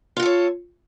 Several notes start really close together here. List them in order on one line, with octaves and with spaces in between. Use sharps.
F4 F#4 A4 C#5